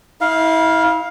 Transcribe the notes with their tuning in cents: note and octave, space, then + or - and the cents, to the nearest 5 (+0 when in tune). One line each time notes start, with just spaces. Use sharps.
E4 -35 F5 +0